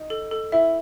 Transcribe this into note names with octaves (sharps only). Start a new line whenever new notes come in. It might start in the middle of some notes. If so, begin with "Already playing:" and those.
Already playing: D#4
A4
A4
E4 E5